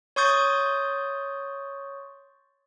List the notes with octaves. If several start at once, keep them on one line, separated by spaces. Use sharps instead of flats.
C#5 C6 C#6 D#6 G6 A6